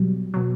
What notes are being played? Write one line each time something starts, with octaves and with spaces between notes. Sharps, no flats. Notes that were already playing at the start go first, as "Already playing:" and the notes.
Already playing: B2 F#3 G3
B2 F#3